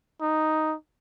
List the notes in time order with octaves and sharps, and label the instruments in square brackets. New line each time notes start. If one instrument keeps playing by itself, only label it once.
[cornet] D#4